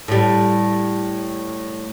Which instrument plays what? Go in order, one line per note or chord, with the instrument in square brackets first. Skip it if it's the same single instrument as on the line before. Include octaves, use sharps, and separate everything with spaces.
[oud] A2 G3